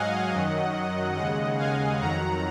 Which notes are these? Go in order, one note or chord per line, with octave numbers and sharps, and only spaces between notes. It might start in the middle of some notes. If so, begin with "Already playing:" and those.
Already playing: G#2 F#3 D#5 F5 F#5 G#5
F#2 D#3 F#3
D#2 C#3 G#3 D#5 F#5
F5 G#5
F2 D#3 F#3 F#5 A#5